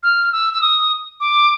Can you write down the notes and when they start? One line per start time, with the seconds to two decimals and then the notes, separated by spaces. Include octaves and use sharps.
0.03 F6
0.32 E6
0.53 E6
0.61 D#6
1.20 D6